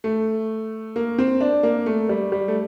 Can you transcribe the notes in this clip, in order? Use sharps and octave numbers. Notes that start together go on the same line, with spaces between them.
A3
A#3
C4
D4
A#3
A3
G3
G3
A3